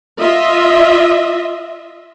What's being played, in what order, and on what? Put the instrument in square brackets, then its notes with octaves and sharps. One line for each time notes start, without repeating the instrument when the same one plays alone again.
[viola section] F4 D#5 E5